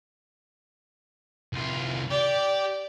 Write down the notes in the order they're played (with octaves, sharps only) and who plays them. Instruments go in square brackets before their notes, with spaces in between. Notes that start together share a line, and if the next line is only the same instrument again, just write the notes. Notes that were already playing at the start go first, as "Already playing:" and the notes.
[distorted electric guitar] C2 F4
[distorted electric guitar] G4 [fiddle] D5